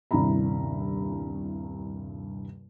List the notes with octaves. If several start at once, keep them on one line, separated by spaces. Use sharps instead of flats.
D#1 C2 G2 E4 A#5 B5